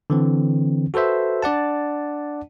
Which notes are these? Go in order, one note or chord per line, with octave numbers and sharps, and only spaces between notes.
D3 E3 C4
F#4 A4 B4 C5 E5
D4 D5 F#5 A5